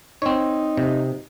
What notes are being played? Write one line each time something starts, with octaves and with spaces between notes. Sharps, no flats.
C4 D#4 C#5
C3